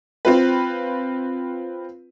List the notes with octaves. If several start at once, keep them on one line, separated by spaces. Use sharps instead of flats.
C4 F4 B4